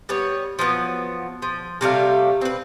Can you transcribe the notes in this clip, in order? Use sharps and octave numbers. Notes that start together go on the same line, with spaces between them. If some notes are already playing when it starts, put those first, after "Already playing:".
G3 B3 C#5
F3 F#3 B3
F3
C3 G3 A3 F5
C4 B4